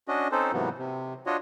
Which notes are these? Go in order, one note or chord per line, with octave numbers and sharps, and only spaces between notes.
C#4 D4 F#4 D#5
C4 C#4 D#4 A4 C5
G#2 C3 E3 F#3 A#3 B3
C3
D4 F4 F#4 C#5 D#5